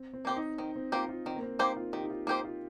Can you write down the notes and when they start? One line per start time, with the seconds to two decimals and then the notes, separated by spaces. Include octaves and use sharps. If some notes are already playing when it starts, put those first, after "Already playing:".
Already playing: C4
0.13 C4
0.25 A#3 C4 G4 C5
0.36 D#4
0.58 D#3 C4
0.76 C4
0.92 A#3 F4 G4 C5
1.09 F4
1.26 D#3 C4
1.36 A#3
1.42 C4
1.59 A#3 D#4 G4 C5
1.76 F4
1.93 D#3 G4
2.03 D#4
2.10 F4
2.27 A#3 D#4 G4 C5
2.44 F4